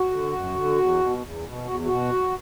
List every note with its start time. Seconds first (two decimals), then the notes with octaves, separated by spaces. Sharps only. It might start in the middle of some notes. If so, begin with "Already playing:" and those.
Already playing: F#4
0.11 D3
0.33 F#2
0.55 D3
0.78 E2
1.00 B2
1.22 E2
1.45 B2
1.66 E2 F#4
1.85 B2 F#4